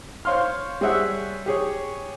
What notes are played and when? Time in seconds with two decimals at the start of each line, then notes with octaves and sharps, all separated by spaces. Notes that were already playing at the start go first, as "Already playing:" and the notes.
0.25 C5 C#5 F5 C6 F6
0.81 G3 G#4 C5 C#5 E5 F#5
1.46 G4 G#4 C#5